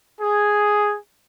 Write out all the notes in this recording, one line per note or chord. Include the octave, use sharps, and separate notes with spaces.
G#4